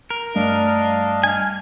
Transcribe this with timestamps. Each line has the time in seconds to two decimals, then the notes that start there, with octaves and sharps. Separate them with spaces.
0.10 A#4
0.35 G2 G3 A3 D4 D#5 F5
1.24 G#5 F6